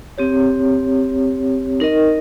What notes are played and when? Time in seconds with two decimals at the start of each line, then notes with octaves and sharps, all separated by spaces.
0.18 C4 G4 C#5
1.80 D#4 A#4 D#5